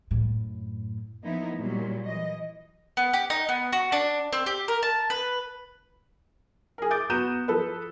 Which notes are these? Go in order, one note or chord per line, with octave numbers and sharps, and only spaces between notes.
F#2 A2
F3 A#3 B3 D#4 E4
A#2 F#3 G3
E3 D#5
B3
G4
D#4
B3
F#4
D4
C4
G4
A#4
A5
B4
G#4 A#4
D6 D#6 G6 A6 D7
B3 F#4 A#5 G6 D#7 E7
F3 A4 B4